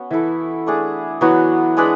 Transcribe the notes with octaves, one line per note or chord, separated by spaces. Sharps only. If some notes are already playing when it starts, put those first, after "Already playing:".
Already playing: B3 C#4 F#4
E3 E4 A4 E5
A3 D4 G#4
E3 F#3 B3 F#4
G#3 D4 G#4 B4